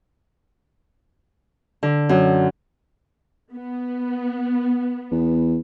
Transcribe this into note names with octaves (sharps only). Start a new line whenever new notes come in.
D3
F#2
B3
E2